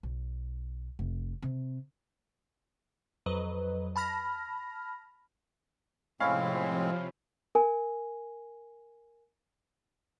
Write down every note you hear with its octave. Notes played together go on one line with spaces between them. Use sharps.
B1
F1
C3
F2 F#3 B4 D#5
A5 B5 F6 A#6
A2 C3 F3 G#3 C4 C#4 E4 F5
A#4 G#5